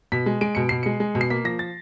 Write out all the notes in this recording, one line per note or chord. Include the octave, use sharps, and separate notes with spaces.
B2 B6
G#3
G#3 D7
B2 C#7
B2 C7
G#3 C#7
G#3
B2
C7
A#3 B6
F3 A#6
A6